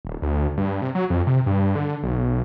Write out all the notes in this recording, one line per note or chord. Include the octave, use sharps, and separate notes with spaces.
D#1
D2
G2
C3
F#3
F2
C3
G2
D3
B1